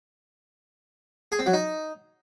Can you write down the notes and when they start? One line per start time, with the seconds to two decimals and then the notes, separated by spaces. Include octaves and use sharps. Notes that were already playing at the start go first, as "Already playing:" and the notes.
1.32 G#4
1.39 C4
1.46 F#3
1.53 D#4